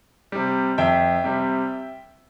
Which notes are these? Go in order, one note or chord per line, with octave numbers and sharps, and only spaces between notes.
C3 G3
F2 E5 G5
C3 G3